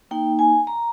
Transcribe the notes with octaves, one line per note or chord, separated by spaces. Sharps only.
A#3 D#4 G5
G#5
A#5